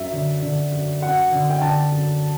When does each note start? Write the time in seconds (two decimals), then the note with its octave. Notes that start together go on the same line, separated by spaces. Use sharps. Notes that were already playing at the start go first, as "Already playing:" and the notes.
Already playing: F#2 E5
0.12 D3
0.42 D3
0.72 F#2
1.02 F#2 F#5
1.31 D3
1.50 G5
1.62 D3 A5
1.92 F#2